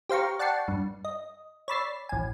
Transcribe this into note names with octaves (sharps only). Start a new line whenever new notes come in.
G4 C5 F5 A#5 C#6
D5 F#5 G5 A5 C#6 C7
G2
D#5
C#5 D5 B5 E6 A6 C7
A1 G#5